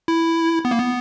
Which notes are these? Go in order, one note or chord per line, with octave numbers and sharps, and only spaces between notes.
E4
B3
A#3
B3